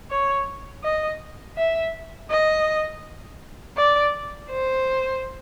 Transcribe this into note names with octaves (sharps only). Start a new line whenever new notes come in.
C#5
D#5
E5
D#5
D5
C5